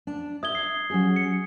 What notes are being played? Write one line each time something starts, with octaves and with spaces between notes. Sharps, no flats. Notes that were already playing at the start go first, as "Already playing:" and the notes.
D4
E5 D#6 G#6 G7
C7
F#3 C#4 G#4
C#7